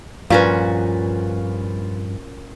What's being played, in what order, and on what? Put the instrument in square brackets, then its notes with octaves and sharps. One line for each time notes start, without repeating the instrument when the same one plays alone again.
[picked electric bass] G2 F3 [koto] A#2 C#4 F#4 [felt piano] F4 B4 [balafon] F5